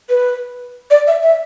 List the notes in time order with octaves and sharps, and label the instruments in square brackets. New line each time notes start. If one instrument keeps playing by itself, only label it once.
[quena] B4
D5
E5
E5